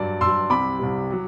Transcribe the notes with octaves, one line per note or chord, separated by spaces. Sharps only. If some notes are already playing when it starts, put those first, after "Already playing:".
Already playing: G2 F#3 D5
G2 F#3 C6 E6
C2 C3 G3 B5 D6
C2 C3 G3
F#3